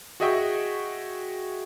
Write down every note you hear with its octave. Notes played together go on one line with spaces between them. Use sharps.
F#4 G#4 D#5 E5 G5 C#6